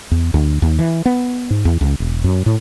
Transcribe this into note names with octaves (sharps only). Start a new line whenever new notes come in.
E2
D2
D#2
E3
B3
G#2
E2
C#2
E1
F#2
A2